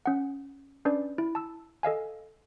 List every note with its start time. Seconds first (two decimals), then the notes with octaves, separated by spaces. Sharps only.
0.06 C#4 F#5
0.85 C#4 D4 B4 D5
1.18 E4
1.35 A5 E6
1.83 A4 D#5 F5 G#5